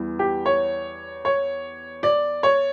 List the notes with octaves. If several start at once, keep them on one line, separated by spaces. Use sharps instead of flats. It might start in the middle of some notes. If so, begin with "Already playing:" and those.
Already playing: E2 E3 G3
G4
C#5
C#5
D5
C#5